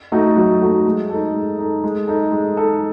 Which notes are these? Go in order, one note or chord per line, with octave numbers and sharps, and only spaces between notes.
A3 D#4 F#4 A4
F#3
A3 D#4 F#4 A4
G#3
D#4 A4
G#3
D#4 A4
G#3
D#4 A4
G#3
D#4 A4